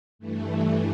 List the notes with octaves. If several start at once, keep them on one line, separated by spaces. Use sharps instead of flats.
G2 E3 A3